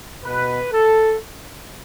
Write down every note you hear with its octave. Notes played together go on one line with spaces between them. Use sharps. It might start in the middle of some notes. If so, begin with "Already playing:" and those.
B2 B4
A4